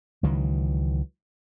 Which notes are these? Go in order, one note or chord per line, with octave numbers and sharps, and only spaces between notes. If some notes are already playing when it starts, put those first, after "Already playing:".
C#2 D#3 E3 F#3